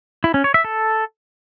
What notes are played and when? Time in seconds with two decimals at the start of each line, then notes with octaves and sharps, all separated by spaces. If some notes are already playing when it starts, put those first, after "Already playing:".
0.24 E4
0.34 C#4
0.44 C#5
0.54 E5
0.64 A4